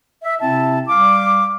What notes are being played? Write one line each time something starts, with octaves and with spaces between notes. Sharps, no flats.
E5
C3 C4 E4 E5 A5
G3 F5 D6